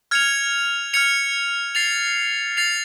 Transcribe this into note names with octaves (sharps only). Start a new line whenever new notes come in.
F6 G#6 C#7 F7
F6 G#6 C#7 F7
A6 C7 F7
A6 C7 F7